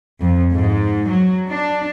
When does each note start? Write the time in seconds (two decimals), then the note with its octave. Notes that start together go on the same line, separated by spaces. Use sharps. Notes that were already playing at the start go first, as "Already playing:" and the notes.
0.21 F2
0.54 G#2
1.11 F#3
1.50 D4